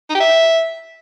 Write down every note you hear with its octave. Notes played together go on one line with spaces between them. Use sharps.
D#4
G4
E5